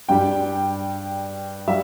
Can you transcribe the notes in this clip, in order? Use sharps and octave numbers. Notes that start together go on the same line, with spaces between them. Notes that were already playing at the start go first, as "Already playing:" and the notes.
G2 G3 G5
G3 E5